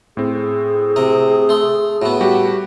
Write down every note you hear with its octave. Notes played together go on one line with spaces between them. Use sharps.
A2 C4 G#4
G#4
C3 A#4
A3 C6
A2 B3 F#4
G3 F#4 G4